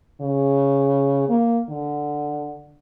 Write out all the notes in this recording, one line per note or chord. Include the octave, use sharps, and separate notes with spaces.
C#3
A#3
D3